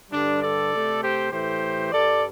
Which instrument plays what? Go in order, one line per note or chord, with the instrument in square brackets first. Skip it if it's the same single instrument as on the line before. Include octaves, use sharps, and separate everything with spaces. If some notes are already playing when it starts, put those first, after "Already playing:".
[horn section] G2 D3 G3 D4
A4 D5
C3 A3
G4 C5
A2 E3 A3 G4 C5
G2 G3 A4 D5